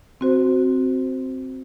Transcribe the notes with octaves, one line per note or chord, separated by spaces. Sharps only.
C4 F#4 C5